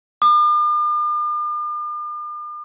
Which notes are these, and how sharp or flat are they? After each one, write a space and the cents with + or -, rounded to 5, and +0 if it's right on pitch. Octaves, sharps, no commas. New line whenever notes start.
D6 +45